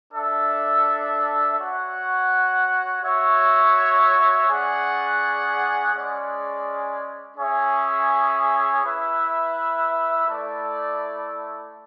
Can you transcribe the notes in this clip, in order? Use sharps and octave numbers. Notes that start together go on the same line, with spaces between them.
D4 A4 E5
F#4 C#5 F#5
F#4 C#5 E5
C#4 G#4 D5 F#5
G#3 C#4 G#4 D5
C#4 G#4 C#5 E5
E4 B4 E5
A3 E4 A4 D5